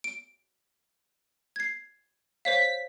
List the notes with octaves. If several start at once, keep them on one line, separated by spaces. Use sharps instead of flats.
D7
G#6 C7
C5 C#5 F5 B6